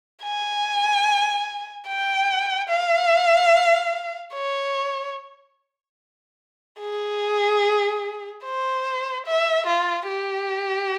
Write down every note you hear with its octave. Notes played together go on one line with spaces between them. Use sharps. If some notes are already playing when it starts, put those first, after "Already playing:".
G#5
G5
F5
C#5
G#4
C5
E5
F4
G4